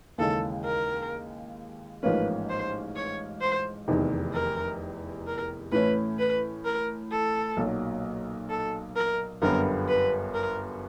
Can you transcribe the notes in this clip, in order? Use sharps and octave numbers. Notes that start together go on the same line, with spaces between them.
D#2 C#3 E3 G#3 A4
A#4
A1 G#2 F3 A#3 C#4 B4
C5
C#5
C5
F1 E2 C3 D#3
A#4
A#4
A2 E3 A3 C#4 E4 B4
B4
A#4
A4
B1 A#2 F#3
A4
A#4
G1 F#2 D3 G3 B3 A#4
B4
A#4